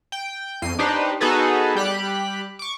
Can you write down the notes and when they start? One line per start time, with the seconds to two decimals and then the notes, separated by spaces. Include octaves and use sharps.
0.12 G5
0.62 F2 C7 D#7
0.79 D4 D#4 G4 B4 C5
1.21 B3 D#4 F#4 G#4 A4 B4
1.75 G3 G4 B5 F#6
2.59 C#6 D6